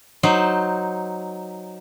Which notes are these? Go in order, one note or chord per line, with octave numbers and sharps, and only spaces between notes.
F#3 D#4 C5